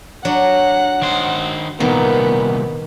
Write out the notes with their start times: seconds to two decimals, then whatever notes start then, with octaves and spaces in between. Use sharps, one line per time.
0.25 F#3 D4 F#5
1.02 D#3 C5
1.80 C2 A#2 D#3 B3